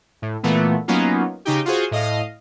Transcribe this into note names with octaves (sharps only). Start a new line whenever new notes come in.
A2
A#2 E3 A3 B3
F#3 A#3 B3 C#4 D#4 F4
C#3 D#4 G4
F4 F#4 G#4 C5
A2 D#5 F5